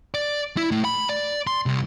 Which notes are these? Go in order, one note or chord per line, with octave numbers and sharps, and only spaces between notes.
D5
E4
A2
B5
D5
C6
C2